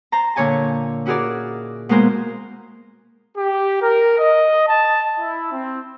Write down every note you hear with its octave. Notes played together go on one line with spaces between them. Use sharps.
C5 A5 A#5
A#2 D3 C#5 G#5 A5
C#4 E4 F#4 G#4 A#4 D5
B2 G#3 A#3 A#4 C5 G#5
G4
A#4
D#5
A5
E4
C4